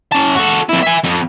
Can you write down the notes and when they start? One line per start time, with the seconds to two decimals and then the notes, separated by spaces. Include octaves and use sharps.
0.12 C#4 A5
0.35 F#4 A4
0.69 F2 E4
0.83 E5 G#5
1.04 F2